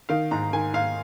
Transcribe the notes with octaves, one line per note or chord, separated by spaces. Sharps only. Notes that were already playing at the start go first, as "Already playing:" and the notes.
D#3 F5
G#2 A#5
D#3 G#5
G#2 F5